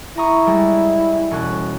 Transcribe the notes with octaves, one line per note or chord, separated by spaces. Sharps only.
E4 A#5 C#6 D#6
G3 G#3
E1 C#4 F#6